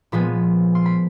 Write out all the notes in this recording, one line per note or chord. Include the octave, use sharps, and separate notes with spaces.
A#2 F3 G#3 B3 B5
C6
B5